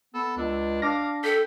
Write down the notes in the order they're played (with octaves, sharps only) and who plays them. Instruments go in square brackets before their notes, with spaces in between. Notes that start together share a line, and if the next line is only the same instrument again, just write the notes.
[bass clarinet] B3 [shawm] A4
[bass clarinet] C#2 [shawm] D4
[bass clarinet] D4 [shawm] F5 [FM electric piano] D6 A#6
[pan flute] A4 [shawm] G5 [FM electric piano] B6